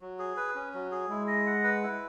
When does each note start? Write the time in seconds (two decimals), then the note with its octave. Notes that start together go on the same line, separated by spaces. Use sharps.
0.01 F#3
0.19 G#4
0.37 B4
0.55 C#4
0.74 F#3
0.91 G#4
1.09 G#3 E4
1.27 D#5
1.46 F#5
1.64 B4
1.83 E4